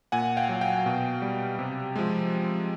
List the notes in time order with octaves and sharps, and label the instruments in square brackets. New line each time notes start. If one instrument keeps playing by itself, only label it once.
[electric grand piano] A#2 F#5 G#5
F5 G5
F#3
F5 G5
B2
G3
C3
F3 G#3